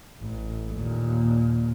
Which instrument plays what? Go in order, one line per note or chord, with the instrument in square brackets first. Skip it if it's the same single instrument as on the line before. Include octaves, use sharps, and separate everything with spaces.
[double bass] A1
D#2 A#2